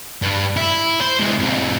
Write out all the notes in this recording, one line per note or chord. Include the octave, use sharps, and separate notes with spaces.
G2
E4
C5
E3 G#3
C2 F2